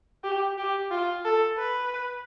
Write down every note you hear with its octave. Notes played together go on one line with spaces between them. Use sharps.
G4
G4
F4
A4
B4